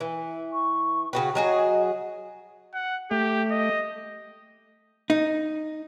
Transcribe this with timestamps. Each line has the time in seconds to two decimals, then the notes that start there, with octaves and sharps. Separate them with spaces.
0.01 E3
0.53 C#6
1.13 C#3 F#4 B4 G5
1.35 F#3 F#4 G#4 D#5
2.74 F#5
3.11 A3 G4
3.51 D#5
5.10 D#4